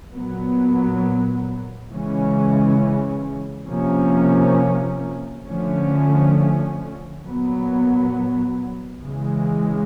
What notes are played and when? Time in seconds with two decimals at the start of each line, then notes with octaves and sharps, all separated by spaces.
0.14 A#2 F#3 B3
1.92 C#3 E3 G#3 C#4
3.69 C3 F3 A#3 C#4
5.46 D3 F3 A3 C#4
7.24 A#2 F#3 B3
9.00 C#3 E3 G#3